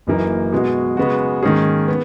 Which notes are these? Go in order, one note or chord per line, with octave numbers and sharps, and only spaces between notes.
F#1 F#2 E3 A#3 D#4
B2 G#3 B3 F#4
C#3 G#3 B3 F#4
G#2 D#3 A#3 C#4 G#4
B3